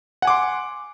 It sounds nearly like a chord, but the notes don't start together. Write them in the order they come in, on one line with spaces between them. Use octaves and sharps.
F#5 G#5 D6 C6